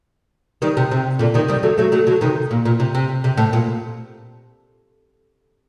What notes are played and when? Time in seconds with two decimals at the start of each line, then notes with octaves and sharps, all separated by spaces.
0.62 D#3 G3
0.77 C3
0.91 C3
1.19 A#2 D3
1.34 C3 D#3
1.48 D#3 G3
1.63 F#3 A3
1.78 F#3 A3
1.92 F#3 A3
2.07 D3 F#3
2.21 C3 D#3
2.51 A#2
2.65 A#2
2.80 C3
2.95 C3
3.24 C3
3.37 A2
3.53 A#2